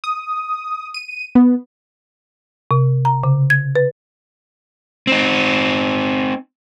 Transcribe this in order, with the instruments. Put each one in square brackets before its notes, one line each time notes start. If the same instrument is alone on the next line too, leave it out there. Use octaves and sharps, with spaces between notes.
[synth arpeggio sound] D#6
D#7
B3
[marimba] C3
A#5
C#3
G#6
B4
[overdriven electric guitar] C4 D#4